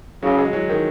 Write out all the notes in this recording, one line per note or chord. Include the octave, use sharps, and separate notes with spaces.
C#3 F#3
G#3
F#3
D#3